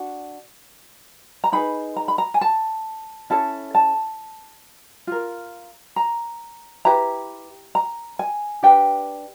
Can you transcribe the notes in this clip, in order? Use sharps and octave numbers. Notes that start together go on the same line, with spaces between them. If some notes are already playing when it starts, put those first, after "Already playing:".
Already playing: D4 F#4
A#5
D#4 G#4 B4 B5
A#5
B5
A#5
G#5
A5
C#4 E4 A4 A5
A5
F4 A#4
A#5
E4 G4 B4 A#5
A#5
G#5
D4 G4 B4 G5